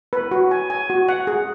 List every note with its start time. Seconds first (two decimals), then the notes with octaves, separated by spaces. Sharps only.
0.13 B4
0.31 F#4
0.51 G#5
0.70 G#5
0.90 F#4
1.09 F#5
1.27 G#4